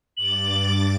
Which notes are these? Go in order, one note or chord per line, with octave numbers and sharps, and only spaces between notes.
G2 D6 A6 F#7